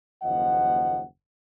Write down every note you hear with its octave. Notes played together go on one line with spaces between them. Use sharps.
F#1 D#2 F3 D#5 F#5